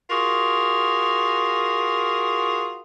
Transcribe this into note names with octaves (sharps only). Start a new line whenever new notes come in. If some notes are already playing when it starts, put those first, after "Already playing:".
F4 F#4 G#4 A#4